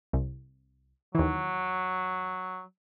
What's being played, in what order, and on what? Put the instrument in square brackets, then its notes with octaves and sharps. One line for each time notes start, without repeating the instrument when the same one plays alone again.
[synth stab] C2
[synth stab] D#2 E3 [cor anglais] F#3